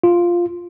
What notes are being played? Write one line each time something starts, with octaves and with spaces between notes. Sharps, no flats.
F4